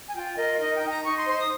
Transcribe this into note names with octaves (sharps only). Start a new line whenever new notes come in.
G#5
F4 G5
A#4 D#5
D#4 D#5
G5
D#4
A#5
D#4 C#6
C6
C5 C6
D#6